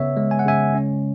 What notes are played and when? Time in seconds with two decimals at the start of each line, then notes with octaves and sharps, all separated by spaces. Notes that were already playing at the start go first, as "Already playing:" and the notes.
Already playing: C#3 B3 C#5 E5
0.17 G#3
0.31 G#5
0.39 F#5
0.46 C#3 E5 G#5
0.75 C#4